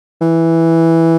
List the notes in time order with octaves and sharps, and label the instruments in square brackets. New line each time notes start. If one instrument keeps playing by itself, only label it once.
[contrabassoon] E3